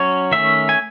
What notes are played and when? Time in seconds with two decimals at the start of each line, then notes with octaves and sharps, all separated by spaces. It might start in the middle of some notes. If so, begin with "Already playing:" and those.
Already playing: F#3 C#4 C#5
0.31 D#3 A3 C#4 E5
0.69 G#5